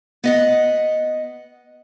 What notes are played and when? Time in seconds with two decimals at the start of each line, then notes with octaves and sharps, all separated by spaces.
0.24 B3 D#5 F#5